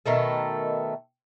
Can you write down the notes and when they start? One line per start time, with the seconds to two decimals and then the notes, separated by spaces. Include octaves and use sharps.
0.06 B2 D#3 A3 A4